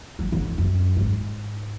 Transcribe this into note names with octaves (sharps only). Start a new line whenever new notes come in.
F#3
D3
E2
F#2
G#2